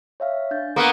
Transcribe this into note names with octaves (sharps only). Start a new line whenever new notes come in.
C#5 E5 F5
D4 G6 A6
A#3 B3 C#6 D#6 C#7